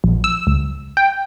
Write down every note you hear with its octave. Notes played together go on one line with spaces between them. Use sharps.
A#1
E6
C#2
G5